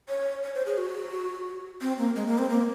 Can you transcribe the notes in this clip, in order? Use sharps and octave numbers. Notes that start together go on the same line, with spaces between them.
C#5
C#5
C5
G#4
F#4
C4
A#3
G#3
A#3
C4
A#3